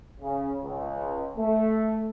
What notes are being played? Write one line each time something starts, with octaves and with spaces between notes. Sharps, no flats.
C#3
C#2
A3